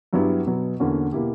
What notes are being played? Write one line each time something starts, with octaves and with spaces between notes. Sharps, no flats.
G2 F#3 B3 E4 G4
B2 F#3 B3
E2 D3 A#3 C#4 F#4
B2 A#3 E4 G4